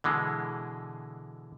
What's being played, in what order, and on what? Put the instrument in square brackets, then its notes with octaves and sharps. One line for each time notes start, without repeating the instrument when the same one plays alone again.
[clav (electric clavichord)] B2 D3 E3 G#3